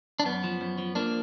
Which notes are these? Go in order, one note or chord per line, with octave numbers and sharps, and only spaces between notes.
D4
F#2 B3
F3
F#2
F3
F3 A#3 D4